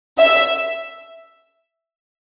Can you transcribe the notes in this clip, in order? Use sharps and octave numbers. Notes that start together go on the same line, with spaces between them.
E5